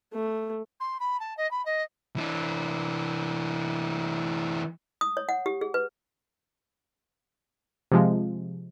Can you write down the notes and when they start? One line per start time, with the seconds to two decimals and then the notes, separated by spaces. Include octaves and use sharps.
0.13 A3
0.80 C6
1.00 B5
1.20 A5
1.37 D#5
1.51 B5
1.65 D#5
2.16 E3 D4
5.01 D#6
5.17 C#5
5.29 F#5
5.46 G4
5.61 G#4
5.74 B4
7.92 C3 F3 G#3